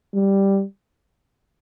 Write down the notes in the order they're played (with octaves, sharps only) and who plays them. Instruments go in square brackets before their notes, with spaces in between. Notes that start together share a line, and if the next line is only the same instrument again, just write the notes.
[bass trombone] G3